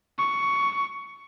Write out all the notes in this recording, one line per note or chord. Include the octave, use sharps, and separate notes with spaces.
C#6